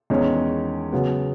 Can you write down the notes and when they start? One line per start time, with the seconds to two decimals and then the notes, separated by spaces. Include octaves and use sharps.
0.10 E2 D#3 G#3 C#4
0.92 C#3 F#3 B3